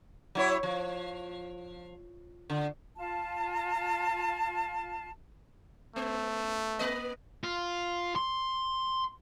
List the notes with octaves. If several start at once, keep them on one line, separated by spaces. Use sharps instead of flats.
F#3 E4 C#5
F3
D3
F4 A5
A3 B3
A#3 B4 D#5
F4
C6